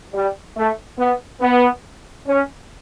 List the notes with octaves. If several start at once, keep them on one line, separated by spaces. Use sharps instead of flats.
G3
A3
B3
B3
C#4